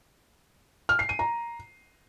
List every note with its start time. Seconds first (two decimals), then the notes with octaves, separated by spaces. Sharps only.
0.89 F6
0.99 C7
1.09 D#7
1.19 A#5